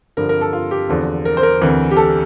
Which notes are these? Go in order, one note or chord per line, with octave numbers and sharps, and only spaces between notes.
G2 D3 F3 A#4
A#4
A4
F4
G4
E2 D3 F3
A#4
C5
A#4
D2 C3 E3
G4
A4